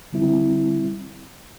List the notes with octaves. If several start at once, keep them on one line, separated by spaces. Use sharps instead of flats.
D3 G3 C4 E4